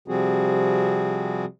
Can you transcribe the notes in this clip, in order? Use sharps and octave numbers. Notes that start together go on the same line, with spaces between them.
C3 F3 G3 C4 F#4 G#4